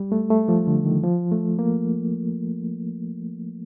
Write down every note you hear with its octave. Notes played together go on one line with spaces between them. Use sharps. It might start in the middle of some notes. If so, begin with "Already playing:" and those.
Already playing: G3
A3
A3
F3
D3
D#3
F3
A3
A#3